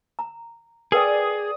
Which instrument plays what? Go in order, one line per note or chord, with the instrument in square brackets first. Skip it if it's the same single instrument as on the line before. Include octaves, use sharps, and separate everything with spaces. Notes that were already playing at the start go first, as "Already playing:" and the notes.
[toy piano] A#5
[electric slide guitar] G#4 [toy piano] A#4 B4 G5 [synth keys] D5 D#6